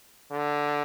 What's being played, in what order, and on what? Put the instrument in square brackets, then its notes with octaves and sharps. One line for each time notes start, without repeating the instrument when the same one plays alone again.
[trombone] D3